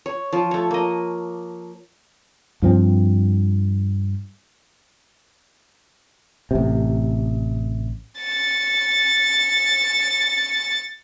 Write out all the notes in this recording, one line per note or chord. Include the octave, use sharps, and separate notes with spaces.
C#5
F3 F4
A3 C#5
A#3 D#5
G2 F3 C4
A1 C3
A6 C#7